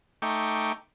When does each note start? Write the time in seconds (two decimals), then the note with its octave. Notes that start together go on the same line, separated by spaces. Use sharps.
0.22 A3 D#4 G5 C#6 D6